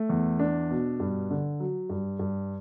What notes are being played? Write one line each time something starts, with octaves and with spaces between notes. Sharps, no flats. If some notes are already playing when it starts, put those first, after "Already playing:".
Already playing: A3
E2
D4
B2
G2
D3
F#3
G2
G2